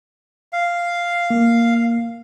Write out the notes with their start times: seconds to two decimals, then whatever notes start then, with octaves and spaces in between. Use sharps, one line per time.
0.53 F5
1.30 A#3